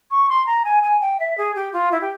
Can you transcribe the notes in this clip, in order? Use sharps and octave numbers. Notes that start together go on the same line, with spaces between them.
C#6
C6
A#5
G#5
G#5
G5
E5
G#4
G4
F4
E4
G4